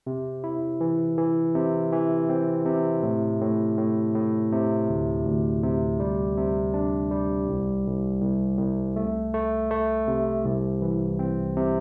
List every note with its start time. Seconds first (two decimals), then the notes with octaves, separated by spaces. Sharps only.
0.07 C3
0.44 E4
0.81 E3
1.17 E3
1.55 C3
1.92 E3
2.29 C4
2.66 C3
3.03 A2
3.41 A2
3.78 A2
4.14 A2
4.52 C3
4.89 D2
5.26 D2
5.63 C3
6.00 G3
6.37 C3
6.74 D4
7.11 G3
7.48 C2
7.86 C2
8.22 C2
8.59 C2
8.96 A3
9.34 A3
9.71 A3
10.08 C3
10.45 C2
10.82 E3
11.19 C4
11.56 C3